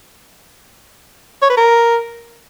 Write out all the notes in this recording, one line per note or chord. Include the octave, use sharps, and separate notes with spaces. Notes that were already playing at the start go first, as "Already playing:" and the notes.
C#5
B4
A#4